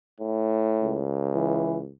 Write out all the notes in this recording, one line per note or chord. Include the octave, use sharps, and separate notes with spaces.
A2
C#2
E3